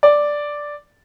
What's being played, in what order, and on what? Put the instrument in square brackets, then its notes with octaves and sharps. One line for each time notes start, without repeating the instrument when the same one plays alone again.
[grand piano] D5